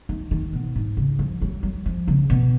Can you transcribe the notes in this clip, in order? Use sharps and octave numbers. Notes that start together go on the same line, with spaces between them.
D#3
D#3
B2
G#2
C#3
F3
F#3
F#3
F3
C#3
B2